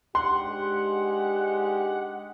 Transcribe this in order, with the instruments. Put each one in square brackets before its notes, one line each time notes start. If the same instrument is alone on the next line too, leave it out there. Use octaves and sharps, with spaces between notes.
[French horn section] G#2 D4 G4 [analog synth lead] F#5 [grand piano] C6
[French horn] G#3